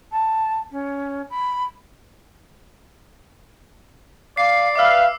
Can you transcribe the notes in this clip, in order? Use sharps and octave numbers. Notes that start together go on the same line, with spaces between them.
A5
C#4
B5
D5 F5 C7
B4 E5 F5 D6 E6